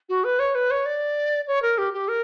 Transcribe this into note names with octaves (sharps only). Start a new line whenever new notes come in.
F#4
B4
C#5
B4
C#5
D5
C#5
A#4
G4
G4
A#4